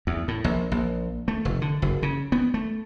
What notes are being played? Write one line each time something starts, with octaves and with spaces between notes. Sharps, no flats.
E2
A2
A#1
A#1
A3
F1
D3
F#1
C#3
B3
A3